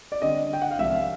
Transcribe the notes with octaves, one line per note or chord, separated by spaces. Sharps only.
D5
D3 G3 C4 D#5
G5
F#5
F5
C2 C3 F3 E5
F5